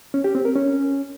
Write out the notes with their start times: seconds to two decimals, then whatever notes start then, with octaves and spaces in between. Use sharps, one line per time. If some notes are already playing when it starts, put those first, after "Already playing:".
0.14 C#4
0.24 G4
0.35 C4
0.45 A#4
0.55 C#4